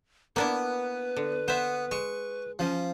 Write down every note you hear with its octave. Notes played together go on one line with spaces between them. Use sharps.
A#3 B3 D4 E4 B4
D3
B3 C5 E5
G#3 C#6
F3 C#4